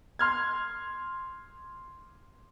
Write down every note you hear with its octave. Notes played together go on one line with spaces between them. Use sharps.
C6 F6 G#6